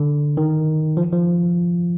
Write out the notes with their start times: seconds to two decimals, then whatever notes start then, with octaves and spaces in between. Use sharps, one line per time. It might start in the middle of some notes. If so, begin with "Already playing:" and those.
Already playing: D3
0.37 D#3
0.97 F3
1.13 F3